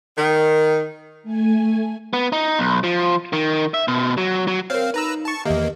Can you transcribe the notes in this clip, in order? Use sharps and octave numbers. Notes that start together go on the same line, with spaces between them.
D#3
A3 G#5
B3
D#4
B1
F3
D#3
E5
B2
F#3
F#3
C4 A#4 C#5 F5
D#4 B4 A#5 E6
A5 C#6
E2 D#3 A#3 G4 D#5 E5